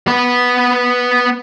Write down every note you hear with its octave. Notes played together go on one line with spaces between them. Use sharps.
B3 B4